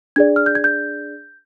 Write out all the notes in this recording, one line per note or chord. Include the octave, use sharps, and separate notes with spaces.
D4 G#4 D5 G#6
F6
G6
G#6
G6